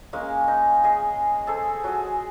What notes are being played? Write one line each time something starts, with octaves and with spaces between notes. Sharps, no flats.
G#3 A#3 C#4 F5
D#4
G#4 D#5
G#4 A4 C5
F#3 G#4